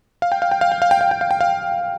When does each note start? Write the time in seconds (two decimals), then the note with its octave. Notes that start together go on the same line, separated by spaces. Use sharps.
0.22 F5
0.32 G5
0.42 F5
0.51 G5
0.61 F5
0.72 G5
0.82 F5
0.91 G5
1.01 F5
1.11 G5
1.21 F5
1.31 G5
1.41 F5